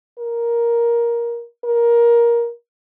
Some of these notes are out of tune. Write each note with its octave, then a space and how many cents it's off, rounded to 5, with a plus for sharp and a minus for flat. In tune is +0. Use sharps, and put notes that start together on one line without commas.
A#4 +10
A#4 +15